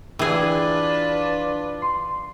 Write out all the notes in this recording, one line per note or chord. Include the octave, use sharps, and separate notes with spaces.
E3 D4 F4 G#4 B4 G5 G#6
C6